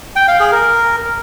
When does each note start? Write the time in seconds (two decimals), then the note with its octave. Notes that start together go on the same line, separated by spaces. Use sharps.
0.16 G5
0.28 F5
0.40 G#4
0.52 A#4